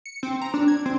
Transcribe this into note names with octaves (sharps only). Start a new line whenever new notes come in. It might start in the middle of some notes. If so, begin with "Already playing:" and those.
C#7
C4
A#5
D4
G#6
C4